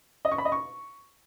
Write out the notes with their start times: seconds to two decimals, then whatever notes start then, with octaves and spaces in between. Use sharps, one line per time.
0.25 D#5
0.32 C#6
0.38 B5
0.45 D#5
0.52 C#6